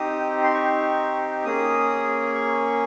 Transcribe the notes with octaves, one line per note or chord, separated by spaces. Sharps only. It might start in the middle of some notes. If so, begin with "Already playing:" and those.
Already playing: C4 D#4 G4 D#6
C6
C#6
A#3 C#4 G#4 D#6
C#6